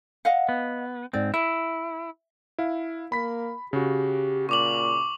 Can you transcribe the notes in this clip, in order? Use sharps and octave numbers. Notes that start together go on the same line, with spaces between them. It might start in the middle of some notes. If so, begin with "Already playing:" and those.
D#5 F5 F#5
B3
G#2 C4 D5
E4 E5
E4 F5
A#3 B5 B6
C#3 F#4 G4
A#2 C#6 D6 F#7